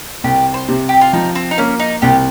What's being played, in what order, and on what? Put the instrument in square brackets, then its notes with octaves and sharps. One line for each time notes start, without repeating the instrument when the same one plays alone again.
[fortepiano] C2 [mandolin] G4
[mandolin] C5
[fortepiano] C3
[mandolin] G4
F4
[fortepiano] F3 [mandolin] D#4
[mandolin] C4
D#4
[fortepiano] A#3 [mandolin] C#4
[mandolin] D#4
[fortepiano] C2 [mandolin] G4